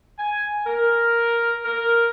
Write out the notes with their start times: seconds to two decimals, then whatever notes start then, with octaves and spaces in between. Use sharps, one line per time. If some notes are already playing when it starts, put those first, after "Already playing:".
0.18 G#5
0.66 A#4
1.64 A#4